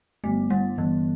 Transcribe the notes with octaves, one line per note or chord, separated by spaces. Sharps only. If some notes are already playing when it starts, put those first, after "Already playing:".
G1 A3
G1 G3
G1 E3